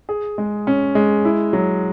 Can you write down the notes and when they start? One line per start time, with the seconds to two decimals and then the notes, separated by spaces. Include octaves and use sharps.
0.09 G#4
0.38 G#3
0.67 C#4
0.95 G#3
1.25 E4
1.53 F#3